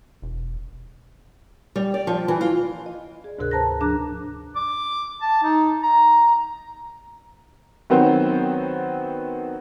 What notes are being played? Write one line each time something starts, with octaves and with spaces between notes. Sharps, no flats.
E1
G3
D5
F3
E3
F4
D#5
G#4 D5
D2 G#2 C3 G#4 A#4 F#6
B4 C5 A5 A#5 F#6 A#6
F3 D4 G#4 A#5 D6 F#6
D6
A5
D#4
A#5
D#3 F#3 B3 C4 C5